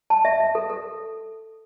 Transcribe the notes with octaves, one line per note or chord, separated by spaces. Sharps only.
A5
E5
E5
A4
A4